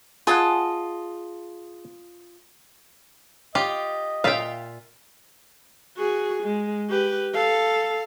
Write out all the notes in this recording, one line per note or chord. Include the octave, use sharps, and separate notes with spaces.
F4 G#4 D#5 F#5 A5
F4 G4 D#5
A#2 F4 E5 F5 G5
F#4 G#4
G#3
G4 B4
A4 F5